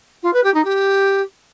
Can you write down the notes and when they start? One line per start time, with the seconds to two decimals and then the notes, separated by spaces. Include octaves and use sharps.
0.23 F4
0.33 B4
0.44 G4
0.54 D#4
0.65 G4